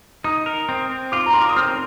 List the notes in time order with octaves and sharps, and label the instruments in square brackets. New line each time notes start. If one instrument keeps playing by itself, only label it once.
[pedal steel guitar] D#4 [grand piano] D#6
[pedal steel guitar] A#4
C4
C4
[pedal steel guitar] F4 [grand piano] D6
[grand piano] A#5
[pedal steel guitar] A#4 [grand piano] C6
[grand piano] D6
D#6
[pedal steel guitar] C4 [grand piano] F6